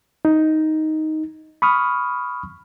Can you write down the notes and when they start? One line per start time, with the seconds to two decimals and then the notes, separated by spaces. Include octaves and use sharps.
0.25 D#4
1.62 B5 C#6 D#6 F6